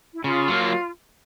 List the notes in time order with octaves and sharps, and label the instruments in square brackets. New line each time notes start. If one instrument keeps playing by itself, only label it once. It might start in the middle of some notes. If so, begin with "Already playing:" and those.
[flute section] E4
[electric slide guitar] C#3 [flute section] F4
[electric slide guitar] F#3 A#3